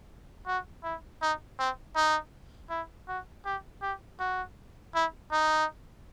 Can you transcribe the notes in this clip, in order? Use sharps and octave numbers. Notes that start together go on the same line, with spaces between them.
F#4
E4
D#4
C4
D#4
E4
F#4
G4
G4
F#4
E4
D#4